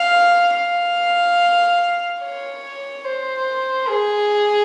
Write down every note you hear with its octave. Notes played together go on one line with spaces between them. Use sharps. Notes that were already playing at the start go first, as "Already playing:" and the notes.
Already playing: F5
F5
C#5
C5
G#4